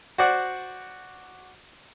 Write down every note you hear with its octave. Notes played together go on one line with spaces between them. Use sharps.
F#4 C5 D5 F#5